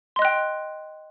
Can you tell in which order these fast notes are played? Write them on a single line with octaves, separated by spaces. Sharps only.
C6 D#5 F#6 G5